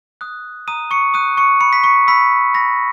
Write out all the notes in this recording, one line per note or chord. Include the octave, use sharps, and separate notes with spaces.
D#6 F#6
A#5 D#6 D#7
C#6 C#7
D#6 F#6 D#7
C#6 C#7
B5 C#7
B6
C#6 C#7
B5 E6 B6
B5 A#6